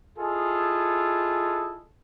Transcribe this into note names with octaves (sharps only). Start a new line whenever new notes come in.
E4 F4 G#4 A4 D#5